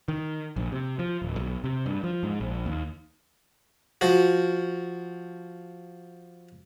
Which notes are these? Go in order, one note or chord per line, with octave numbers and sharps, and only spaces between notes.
D#3
A#1
C3
F3
D1
B1
C3
G2
F3
G#2
A#1
D#2
F3 F#4